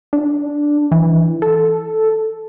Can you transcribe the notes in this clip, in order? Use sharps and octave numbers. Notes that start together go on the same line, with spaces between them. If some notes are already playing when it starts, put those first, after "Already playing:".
D4
E3
A4